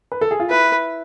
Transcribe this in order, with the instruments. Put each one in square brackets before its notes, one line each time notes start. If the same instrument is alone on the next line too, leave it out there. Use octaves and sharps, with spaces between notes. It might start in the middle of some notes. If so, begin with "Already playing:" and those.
[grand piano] B4
A4
G#4
F4
[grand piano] E4 [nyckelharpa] B4